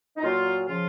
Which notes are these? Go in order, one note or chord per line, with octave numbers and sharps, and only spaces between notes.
D#4
A#2 F#3 F4
C#3 F3 F4